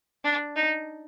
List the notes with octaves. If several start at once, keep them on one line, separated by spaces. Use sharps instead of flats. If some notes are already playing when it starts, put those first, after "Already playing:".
D4
D#4